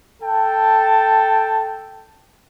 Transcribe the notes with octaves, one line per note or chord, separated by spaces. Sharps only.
A4 G5 A5